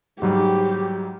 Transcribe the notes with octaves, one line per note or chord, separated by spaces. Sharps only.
G#2 F#3 G3 G4